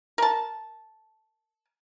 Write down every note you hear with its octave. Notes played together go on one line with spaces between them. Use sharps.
A#4 A5